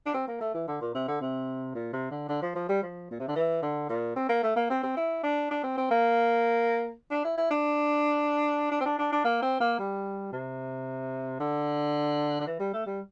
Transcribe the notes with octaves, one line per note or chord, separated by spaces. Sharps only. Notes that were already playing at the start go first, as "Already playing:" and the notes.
D4
C4
A#3
A3
E3
D3
A#2
C3
D3
C3
A#2
C3
D3
D3
F3
F3
G3
F3
A#2
C3
D3
E3
D3
A#2
C4
A#3
A3
A#3
C4
C4
E4
D4
D4
C4
C4
A#3
D4
E4
E4
D4
D4
C4
D4
D4
D4
A#3
C4
A#3
G3
C3
D3
D3
E3
G3
A3
G3